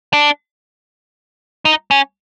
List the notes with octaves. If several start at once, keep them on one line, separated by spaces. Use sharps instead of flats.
D4
D#4
C#4